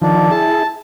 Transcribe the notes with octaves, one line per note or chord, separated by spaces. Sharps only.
D#3 F3 D4
E4 G#4 A5